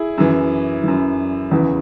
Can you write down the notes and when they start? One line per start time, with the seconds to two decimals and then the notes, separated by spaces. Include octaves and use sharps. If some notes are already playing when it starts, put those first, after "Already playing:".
Already playing: E4 G#4
0.18 F#2 E3
0.84 F#2 E3
1.51 E2 C#3 E3